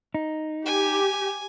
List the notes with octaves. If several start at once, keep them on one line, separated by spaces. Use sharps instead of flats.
D#4
G4 G#5